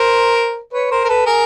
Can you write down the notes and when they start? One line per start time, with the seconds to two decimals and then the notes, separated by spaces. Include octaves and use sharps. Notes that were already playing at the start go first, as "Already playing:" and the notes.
Already playing: A#4 C5
0.73 B4 C#5
0.91 A#4 C5
1.04 A#4
1.09 A4 B4
1.26 G#4 A#4